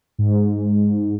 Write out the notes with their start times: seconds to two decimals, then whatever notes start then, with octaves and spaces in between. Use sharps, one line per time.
0.18 G#2